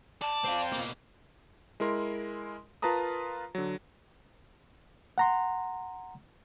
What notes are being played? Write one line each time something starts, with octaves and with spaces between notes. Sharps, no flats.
D5 A5
C4 F4
B2 A#3
G#3 E4 A#4 C6
F4 A#4 B4 A5 A#5 D#6
D3 F#3
F#5 A#5 C6